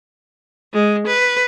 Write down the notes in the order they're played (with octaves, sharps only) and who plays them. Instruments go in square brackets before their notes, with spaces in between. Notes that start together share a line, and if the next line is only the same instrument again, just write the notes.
[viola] G#3
B4